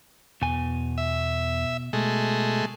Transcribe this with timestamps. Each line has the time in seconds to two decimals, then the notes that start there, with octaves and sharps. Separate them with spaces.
0.42 E2 B2 G#5
0.98 E5
1.93 B2 G#3 A3